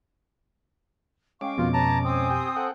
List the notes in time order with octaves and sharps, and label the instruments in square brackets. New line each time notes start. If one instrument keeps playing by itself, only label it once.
[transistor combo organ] G#3 C#4 D6 [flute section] F5 G5 C#6
[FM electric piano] F2 B2 [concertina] F4 [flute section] A#4
[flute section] B4 C#5 [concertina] A5 A#5
[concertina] C4 [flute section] C5 G#5 D#6
[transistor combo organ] G4 G5
A4 F#5 G5